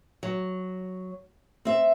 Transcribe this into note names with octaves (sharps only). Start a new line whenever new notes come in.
F#3
C4 E5